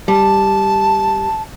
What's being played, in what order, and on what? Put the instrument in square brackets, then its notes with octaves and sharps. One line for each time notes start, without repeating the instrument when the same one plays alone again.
[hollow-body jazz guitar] G3 [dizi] A5